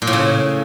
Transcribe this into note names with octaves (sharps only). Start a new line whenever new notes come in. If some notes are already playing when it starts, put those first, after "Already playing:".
A#2
A2
C#3